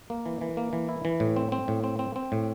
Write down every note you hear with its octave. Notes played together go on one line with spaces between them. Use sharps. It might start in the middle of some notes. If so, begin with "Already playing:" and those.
A#3
E3
E3
A#3
E3
E4
E3
A2
C4
C4
A2
C4
C4
C4
A2